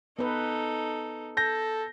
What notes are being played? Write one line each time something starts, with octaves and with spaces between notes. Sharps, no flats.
B3 D#4 A4 B4
A4 G6 A#6